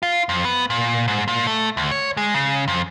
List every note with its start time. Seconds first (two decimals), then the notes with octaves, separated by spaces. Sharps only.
0.03 F4
0.29 F2
0.45 B3
0.70 A#2
1.08 G#2
1.28 A#2
1.47 A3
1.77 D2
1.91 C#5
2.17 G#3
2.34 C#3
2.68 F2